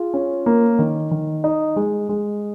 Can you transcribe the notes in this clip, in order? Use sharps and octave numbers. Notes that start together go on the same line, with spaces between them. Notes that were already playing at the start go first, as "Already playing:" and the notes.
Already playing: F4 G#4
C#4
A#3
D#3
D#3
D#4
G#3
G#3